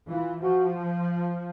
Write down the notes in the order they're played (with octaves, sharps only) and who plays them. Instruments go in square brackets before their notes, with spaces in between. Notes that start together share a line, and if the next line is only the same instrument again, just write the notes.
[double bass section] E3 [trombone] F4
[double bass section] F3 [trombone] F#4